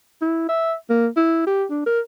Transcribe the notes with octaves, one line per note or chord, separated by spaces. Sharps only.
E4
E5
A#3
E4
G4
D4
A#4